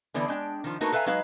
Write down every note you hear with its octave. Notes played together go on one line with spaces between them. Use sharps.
D3 E3 B3 D5
G#3 D4 G5
D#3 F3
A3 A#3 D#4 F#4 A#4 B4
A4 B4 E5 F5 G#5 A#5
F#3 G#3 D#4 B4 F5